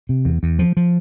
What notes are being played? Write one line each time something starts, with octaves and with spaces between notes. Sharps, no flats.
C3
E2
E2
F3
F3